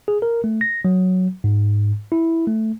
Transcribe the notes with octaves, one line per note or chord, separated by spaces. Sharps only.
G#4
A#4
A3
A#6
F#3
G#2
E4
A3